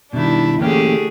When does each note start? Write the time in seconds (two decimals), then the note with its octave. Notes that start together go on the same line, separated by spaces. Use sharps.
0.13 B2 D#3 G3 D4 E4
0.61 D3 E3 A3 A#3 C#4 G4 G#4